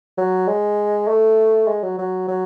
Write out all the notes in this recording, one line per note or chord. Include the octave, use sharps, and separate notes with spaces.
F#3
G#3
A3
G#3
F#3
F#3
F#3